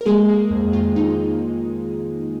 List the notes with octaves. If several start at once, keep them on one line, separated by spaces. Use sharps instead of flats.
A#4
G#3 A#3 G#4
A#3
F2
D#3 F4
F2 D#4